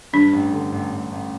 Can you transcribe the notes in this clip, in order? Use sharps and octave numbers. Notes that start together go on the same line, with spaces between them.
G2 D4
A1
D3
A1
A1
A1